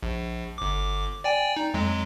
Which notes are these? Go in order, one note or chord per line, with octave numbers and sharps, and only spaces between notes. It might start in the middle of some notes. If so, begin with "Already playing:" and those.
A#1
G1 D6
D5 G5 G#5
D#4
F2 F#3 G#3